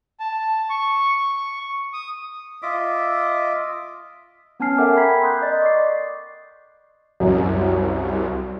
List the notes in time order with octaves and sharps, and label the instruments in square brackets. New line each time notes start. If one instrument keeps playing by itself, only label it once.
[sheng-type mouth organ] A5
C#6
D#6
[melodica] F4 D#5 E5 D6
[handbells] B3 C#4 G#5 A5 F6 C7
A4 A#4 E5 F#5 G5 D6
A#4 A#5 B5 G#6 B6 C7
C6 D#6 F#6 G6
D5 D#5 A6
C#6 D6 C7
[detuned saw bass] C2 [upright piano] F#2